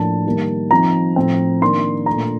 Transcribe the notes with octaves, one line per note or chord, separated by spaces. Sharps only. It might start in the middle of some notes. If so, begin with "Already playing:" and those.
Already playing: A2 F3 A#3 D4 A5
D#3 G3 A#3
F3 C4 D#4 A#5
A2 F3 C4
D#3 A#3 D4 C6
A#2 A3 D4 A#5